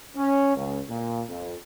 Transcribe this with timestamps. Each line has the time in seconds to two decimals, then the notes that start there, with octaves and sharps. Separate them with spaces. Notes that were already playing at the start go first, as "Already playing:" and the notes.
0.17 C#4
0.56 C#2
0.89 A#2
1.29 F2